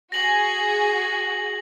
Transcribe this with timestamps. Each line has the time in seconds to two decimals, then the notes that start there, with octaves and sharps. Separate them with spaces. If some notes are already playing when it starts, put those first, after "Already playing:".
0.12 F#4 G#4 A#6 F#7